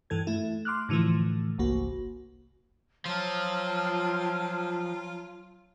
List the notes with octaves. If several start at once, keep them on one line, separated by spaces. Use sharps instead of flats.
G2 E3 A4 G#6
A3 E4
C6 D6 F6 F#6
A2 D3 E3 F3 A3
G1 C2 A#3 F#4
F3 F#3 F4 G5 A5 F6